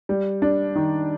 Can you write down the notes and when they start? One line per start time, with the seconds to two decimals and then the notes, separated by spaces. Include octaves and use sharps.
0.09 G3
0.42 D4
0.75 D#3